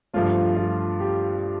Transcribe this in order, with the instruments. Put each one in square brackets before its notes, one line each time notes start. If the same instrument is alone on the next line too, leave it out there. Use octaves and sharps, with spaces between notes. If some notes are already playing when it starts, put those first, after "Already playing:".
[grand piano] G2 F3 A3 F4
F4
G4